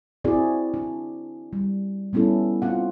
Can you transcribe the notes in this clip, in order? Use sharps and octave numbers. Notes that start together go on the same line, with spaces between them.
C4 E4 F#4 G#4 D5
D4
G3
G3 B3 C#4 E4 A4
C4 F4 F#5